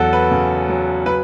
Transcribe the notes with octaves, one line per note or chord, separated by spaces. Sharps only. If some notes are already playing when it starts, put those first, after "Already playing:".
Already playing: E2 F#3 F#4 A4
B4
C#3
F#3
F#3 B4